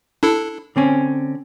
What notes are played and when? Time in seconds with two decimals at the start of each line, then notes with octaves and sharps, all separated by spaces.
0.23 D4 E4 A4
0.76 D3 C4 C#4